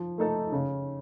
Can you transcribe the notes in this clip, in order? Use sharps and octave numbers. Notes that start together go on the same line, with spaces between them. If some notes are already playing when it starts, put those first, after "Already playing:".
Already playing: F3
A3 D#4 A4
C#3